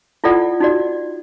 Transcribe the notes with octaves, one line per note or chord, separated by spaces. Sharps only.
E4 F4 A4 D5 F#5
D#4 F#4 D5